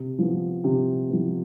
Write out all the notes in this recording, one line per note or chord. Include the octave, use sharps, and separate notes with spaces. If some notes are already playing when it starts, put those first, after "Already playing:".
Already playing: C3
F3 B3
C3
F3 B3